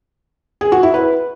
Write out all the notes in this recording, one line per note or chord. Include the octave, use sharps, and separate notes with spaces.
G#4
F#4
E4
B4